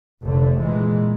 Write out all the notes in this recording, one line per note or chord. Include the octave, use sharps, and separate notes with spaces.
F1 D3 A3
A#2 E3 G#3